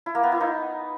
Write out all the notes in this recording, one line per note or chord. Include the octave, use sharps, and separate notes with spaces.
E4
A#3
B3
E4
D#4